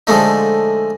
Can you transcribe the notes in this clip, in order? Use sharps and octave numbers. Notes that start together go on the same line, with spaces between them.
D3 F3 G#3 A3 D#4